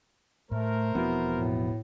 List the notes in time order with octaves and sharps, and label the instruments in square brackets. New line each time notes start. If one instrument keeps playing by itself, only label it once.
[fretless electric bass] A2 [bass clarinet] A3 [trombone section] A#4 C5
[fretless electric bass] E1 F3 C4 [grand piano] B3 E4 F#4
[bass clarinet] A2